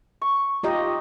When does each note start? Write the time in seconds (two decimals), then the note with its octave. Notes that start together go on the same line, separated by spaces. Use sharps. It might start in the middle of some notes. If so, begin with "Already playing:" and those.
0.21 C#6
0.63 D#4 F4 G4 D#5